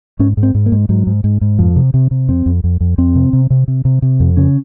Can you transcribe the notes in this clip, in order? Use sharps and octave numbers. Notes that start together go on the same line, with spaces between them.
G#2 C#4
G#2
C4
G#2
A#3
G#2
G#2 F#3
G#2
G#2
G#2
F2 F3
C3
C3
C3
F2 C4
F2
F2
F2
F2 C4
C3
C3
C3
C3
C3
C3
F2
C#3 C#4